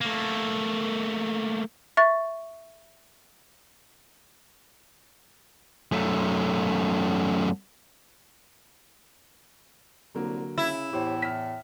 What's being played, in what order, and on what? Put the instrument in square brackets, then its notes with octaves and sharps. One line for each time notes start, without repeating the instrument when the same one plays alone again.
[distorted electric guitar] A3 A#3
[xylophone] E5 C#6 A6
[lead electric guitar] F#2 A3
[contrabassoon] C2 [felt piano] D3 F#3 A#3
[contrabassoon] C#3 [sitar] E4
[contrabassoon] E2 [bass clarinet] A2 [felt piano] G4 C5 C#5
[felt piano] F6 B6